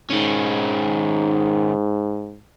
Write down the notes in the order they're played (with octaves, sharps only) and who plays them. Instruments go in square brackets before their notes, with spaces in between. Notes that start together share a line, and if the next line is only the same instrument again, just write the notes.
[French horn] G#2 [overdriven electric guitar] D#3 C#4